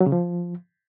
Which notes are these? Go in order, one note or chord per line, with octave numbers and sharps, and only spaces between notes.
F#3
C#3
F3